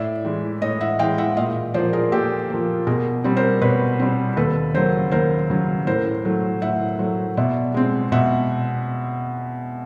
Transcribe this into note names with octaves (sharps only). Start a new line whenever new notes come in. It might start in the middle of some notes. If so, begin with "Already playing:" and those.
Already playing: A2 D5 E5
E3 G#3
A2 C#5 D#5
E5 F#5
E3 G#3 F5 G5
E5 F#5
A#2 D#5 F5
F3 A#3 C5 D5
G#4 A#4
A#2 G4 A4
F3 A#3
B2 G#4 A#4
G3 C4
A#4 C5
B2 B4 C#5
G3 C4
D#2 A4 B4
C#3 F#3 A#4 C5
D#2 A#4 C5
C#3 F#3
A2 A#4 C5
F#3 A3
A2 E5 F#5
F#3 A3
B2 D5 E5
G#3 C4
B2 E5 F#5